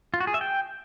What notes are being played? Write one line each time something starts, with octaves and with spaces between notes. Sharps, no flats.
F4
F#4
G#4
E5
G5